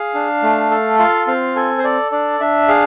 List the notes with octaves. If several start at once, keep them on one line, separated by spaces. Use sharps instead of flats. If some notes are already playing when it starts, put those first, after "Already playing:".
Already playing: G#4 F5
D4
A3
A4
F4 F5
C4 F5
A4 G#5
C5
A4 D5
D4 D5
D4 E5
G#4 F5